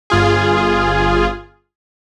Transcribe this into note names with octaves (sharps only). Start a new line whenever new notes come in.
G1 F4 G#4